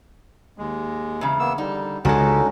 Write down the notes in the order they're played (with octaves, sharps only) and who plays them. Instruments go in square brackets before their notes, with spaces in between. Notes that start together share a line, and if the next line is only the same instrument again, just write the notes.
[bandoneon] D#2 G#3
[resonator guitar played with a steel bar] E2 C#3
[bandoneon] A#3 B3 E6
[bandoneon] D3 G3 [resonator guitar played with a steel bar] D#4
[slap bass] C#2 F#3 G#3 [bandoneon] D3 C#4 D#4 [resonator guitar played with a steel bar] F#4 A4